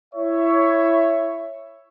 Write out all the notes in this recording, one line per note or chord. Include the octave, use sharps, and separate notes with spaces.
E4 C#5 E5